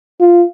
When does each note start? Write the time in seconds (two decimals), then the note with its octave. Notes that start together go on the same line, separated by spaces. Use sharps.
0.20 F4